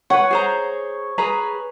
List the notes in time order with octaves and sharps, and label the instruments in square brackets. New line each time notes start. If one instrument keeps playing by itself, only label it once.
[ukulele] B4 F#5 [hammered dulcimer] C#5
[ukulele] G#4 C5 A#5
G#4 B4 A#5